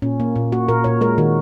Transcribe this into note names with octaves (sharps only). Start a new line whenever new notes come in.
A#2 C#4
A#3
A#2
A#3 F#4
A#2 A#4
A#2 C#5
G#3 A#4
D#3 F#4